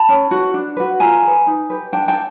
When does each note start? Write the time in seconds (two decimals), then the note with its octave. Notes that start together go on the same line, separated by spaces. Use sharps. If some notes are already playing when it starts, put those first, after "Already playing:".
Already playing: A5 B5
0.09 C#4
0.31 F#4 B4
0.54 D4
0.77 F#4 B4
1.00 F4 G#5 A#5
1.23 G#4 B4
1.47 D#4
1.70 G4 B4
1.93 D4 G5 A5
2.08 G5 A5